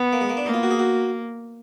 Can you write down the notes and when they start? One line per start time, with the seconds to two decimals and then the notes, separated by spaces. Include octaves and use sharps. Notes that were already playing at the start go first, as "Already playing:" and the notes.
Already playing: B3
0.13 A#3
0.21 G#3
0.29 A#3
0.37 D4
0.45 A#3 D#4
0.54 F4
0.63 F#4
0.71 G#4
0.79 F#4